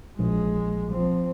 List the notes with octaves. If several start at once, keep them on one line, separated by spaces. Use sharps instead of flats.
A#1 G#3
F3 C4